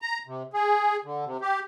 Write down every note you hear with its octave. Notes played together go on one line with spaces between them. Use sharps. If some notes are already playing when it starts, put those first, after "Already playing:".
A#5
C3
G#4
D3
C3
G4